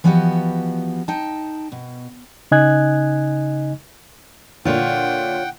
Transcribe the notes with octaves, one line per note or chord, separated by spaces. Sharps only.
E3 F3 B3 F#4 G4 D#5
D#4 G5 A5
B2
C#3 D#4 D#5 G#5 F#6 G#6
A#2 D3 F4 C#5 F#5 G5